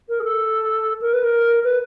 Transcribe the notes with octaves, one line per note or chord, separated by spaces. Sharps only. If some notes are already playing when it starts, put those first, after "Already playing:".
A#4
G#4
A4
A#4
B4
A#4
B4